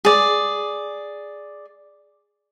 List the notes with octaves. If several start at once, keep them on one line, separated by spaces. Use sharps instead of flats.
G#4 D5